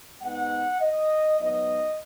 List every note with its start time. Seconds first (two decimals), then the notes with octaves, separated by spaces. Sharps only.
0.22 G#2 G#3 B3 D#4 F#5
0.81 D#5
1.40 G#2 F#3 B3 D#4 D#5